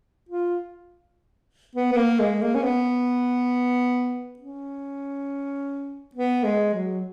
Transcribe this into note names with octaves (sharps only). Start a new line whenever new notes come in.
F4
B3
B3
A#3
G#3
A#3
C#4
B3
C#4
B3
G#3
F#3